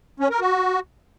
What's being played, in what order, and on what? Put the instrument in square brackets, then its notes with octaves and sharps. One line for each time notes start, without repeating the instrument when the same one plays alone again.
[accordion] C#4
A#4
F#4